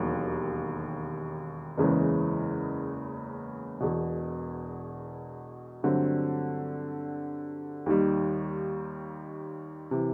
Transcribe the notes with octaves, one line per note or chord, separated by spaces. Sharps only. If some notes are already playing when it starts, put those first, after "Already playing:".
Already playing: E1 D#2 D#3 F#3
F#1 E2 C#3 E3 G#3
E1 E2 B2
G2 D3 F#3 A3 C4
D#2 D#3 G3
C3 E3